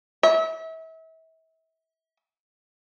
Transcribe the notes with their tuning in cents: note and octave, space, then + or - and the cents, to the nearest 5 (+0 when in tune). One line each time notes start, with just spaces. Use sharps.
E5 -35